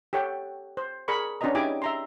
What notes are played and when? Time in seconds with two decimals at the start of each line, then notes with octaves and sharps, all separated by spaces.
0.13 G4 A4 C#5 F#5 G5
0.77 C5
1.08 G#4 A#4 D5 B5 C#6
1.41 C#4 D4 F#4 B4 D#5 A#5
1.55 D#4 E4 G4 G#4 G#5 D6
1.82 E5 A#5 C6